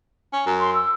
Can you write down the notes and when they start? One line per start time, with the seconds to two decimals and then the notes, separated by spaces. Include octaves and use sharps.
0.33 C#4
0.46 F#2
0.60 C6
0.74 E6